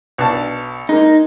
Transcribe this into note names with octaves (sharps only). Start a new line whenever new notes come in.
B1 D4 A5
G#3 A#3 D#4